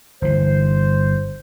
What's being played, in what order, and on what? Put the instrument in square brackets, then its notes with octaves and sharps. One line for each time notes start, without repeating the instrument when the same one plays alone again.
[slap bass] G1 E3 [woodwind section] C5